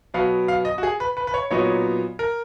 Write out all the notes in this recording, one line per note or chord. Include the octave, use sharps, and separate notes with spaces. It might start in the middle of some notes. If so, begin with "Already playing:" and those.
B2 F#3 B3 F5
F5
D#5
F#4
G#4
B4
B4
B4
C#5
A#2 F#3 B3 D#4 C#5
A#4